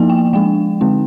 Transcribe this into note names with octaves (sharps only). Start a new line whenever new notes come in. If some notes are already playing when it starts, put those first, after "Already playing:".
Already playing: F3 A#3 D#4 G#5
G5
F3 G#3 D4 G5
D3 G#3 C4 D#4